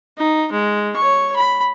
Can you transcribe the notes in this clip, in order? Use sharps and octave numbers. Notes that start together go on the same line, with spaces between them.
D#4
G#3
C#5 C#6
B5